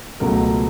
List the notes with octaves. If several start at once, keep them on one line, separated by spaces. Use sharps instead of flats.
C#2 B2 F#3 A3 A#4